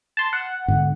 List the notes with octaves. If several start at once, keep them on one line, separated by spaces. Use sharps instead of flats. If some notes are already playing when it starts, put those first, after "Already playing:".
A5 C6
F#5
G#2 B2 D3